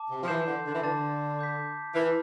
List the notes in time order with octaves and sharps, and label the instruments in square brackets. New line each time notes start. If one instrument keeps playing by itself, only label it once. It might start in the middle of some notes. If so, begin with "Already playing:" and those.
Already playing: [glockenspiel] A5 D6
[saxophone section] C3
F3
[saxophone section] E3 [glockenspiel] C6 G6 C7 E7
[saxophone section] D3
D3
E3
[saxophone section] D3 [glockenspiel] A5 D6 A6
[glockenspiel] D6 G6 B6
[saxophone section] E3 [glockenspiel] F6 B6 D7